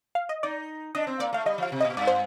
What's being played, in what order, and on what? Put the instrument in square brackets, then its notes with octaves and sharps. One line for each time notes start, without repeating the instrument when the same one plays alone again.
[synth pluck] F5
D#5
[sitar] D#4 [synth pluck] D5
[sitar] D4 [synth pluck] D#5
[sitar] C4
[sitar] A#3 [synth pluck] D5
[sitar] A3 [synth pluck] F5
[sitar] G3 [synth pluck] D#5
[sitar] F3 [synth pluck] F5
[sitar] C3
[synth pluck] D#5
[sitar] A#2
[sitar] G2 [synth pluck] D5
[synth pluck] C5